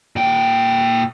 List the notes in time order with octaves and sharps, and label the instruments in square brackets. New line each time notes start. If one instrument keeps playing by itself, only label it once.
[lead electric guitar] A#2 G5